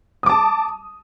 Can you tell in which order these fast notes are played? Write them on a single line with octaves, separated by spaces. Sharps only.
D#6 D6 A5